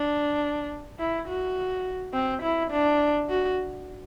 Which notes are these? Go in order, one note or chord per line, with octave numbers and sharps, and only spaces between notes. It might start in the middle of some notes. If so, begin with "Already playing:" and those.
Already playing: D4
E4
F#4
C4
E4
D4
F#4